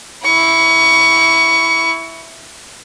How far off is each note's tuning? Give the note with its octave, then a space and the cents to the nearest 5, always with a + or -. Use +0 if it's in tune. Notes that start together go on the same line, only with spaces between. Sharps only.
E4 +0 C#6 +25